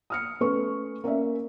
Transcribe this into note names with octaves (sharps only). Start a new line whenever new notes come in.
D#6 F6 C#7
A3 C#4 A4 B4 C#6
A#3 C#4 D5 E5